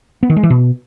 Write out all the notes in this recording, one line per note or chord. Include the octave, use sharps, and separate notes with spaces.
B3
D#3
G#3
E3
B2